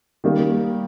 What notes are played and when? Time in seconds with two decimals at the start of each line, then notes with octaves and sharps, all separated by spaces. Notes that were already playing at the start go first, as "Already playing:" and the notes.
0.24 D#3 G3 A#3